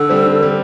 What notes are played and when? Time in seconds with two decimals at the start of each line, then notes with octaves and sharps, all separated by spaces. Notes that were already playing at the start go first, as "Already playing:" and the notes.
Already playing: D3 A4
0.09 G3 C4
0.25 D3
0.41 G3 C4